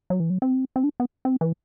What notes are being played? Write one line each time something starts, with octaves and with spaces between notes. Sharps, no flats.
F#3
E3
F#3
C4
C4
D4
B3
C4
E3